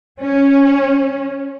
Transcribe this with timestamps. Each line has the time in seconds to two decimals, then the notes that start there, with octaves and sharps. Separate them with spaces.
0.19 C#4